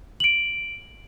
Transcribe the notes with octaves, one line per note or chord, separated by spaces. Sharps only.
D7 F#7